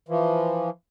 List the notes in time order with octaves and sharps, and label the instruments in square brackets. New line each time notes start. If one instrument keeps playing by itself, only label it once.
[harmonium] E3 F3